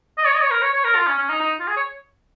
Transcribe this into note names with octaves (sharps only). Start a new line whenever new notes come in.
D#5
C#5
D#5
C#5
A#4
C#5
C#5
A#4
F4
C#4
C#4
D#4
D#4
F4
G#4
C#5